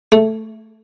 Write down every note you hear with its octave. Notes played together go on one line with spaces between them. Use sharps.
A3